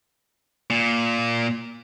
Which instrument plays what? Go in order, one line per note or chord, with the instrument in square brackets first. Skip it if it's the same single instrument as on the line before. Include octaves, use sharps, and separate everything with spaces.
[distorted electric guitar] A#2